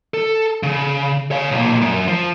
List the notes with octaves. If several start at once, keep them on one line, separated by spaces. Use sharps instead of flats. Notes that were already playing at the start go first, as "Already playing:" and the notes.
A4
C#3
C#5 F5
B1 A#2
F#2
F3